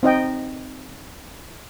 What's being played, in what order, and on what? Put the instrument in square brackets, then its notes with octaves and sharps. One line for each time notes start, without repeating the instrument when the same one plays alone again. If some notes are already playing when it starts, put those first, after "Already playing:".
[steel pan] C4 D#4 D#5 G5